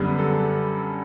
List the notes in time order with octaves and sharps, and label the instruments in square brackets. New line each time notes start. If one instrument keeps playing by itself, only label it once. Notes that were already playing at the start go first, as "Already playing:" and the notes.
Already playing: [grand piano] F#2 D3 G3 B3
A4